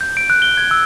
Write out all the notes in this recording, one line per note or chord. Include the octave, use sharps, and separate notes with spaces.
G6
D7
F#6
G7
G#6
E6